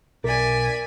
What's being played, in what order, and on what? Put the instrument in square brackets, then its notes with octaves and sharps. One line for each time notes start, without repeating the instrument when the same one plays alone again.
[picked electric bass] B1 [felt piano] A#4 [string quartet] D5 E5 G#5